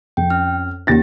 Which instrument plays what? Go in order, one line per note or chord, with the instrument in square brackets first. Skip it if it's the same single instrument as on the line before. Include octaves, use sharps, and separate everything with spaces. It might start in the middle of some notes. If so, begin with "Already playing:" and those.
[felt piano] F2 [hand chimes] G5
[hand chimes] C#4 F6
[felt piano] D#2 A6 A#6 [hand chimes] C#4 G4